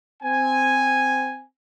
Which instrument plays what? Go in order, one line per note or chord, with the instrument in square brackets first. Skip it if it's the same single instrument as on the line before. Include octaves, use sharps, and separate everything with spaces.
[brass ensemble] C4 G#5